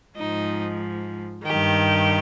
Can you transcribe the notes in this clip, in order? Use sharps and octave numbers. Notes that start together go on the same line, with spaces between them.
G#2 F3 D#4
G2 D#3 G4